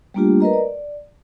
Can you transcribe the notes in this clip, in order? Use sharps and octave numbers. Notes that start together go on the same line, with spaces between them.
G3 A3 A#3 D4 F4 G4
A#4 B4 D#5 A#5
D5